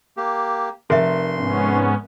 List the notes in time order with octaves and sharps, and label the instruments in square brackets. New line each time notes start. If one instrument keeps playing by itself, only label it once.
[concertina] A#3 G4
[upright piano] F1 [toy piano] A#4 E5 [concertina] C6
[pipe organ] G#2 B3 C#4